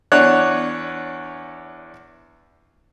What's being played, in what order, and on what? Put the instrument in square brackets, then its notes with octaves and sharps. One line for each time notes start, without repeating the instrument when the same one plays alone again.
[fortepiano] E2 D4 C#5 F#5 F#6